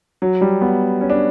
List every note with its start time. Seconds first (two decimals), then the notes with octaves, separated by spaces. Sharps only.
0.22 F#3
0.41 G3
0.61 B3
1.01 C#4
1.10 D4